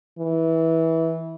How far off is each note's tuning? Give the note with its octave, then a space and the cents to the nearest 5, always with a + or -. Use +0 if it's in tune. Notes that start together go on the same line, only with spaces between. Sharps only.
E3 -20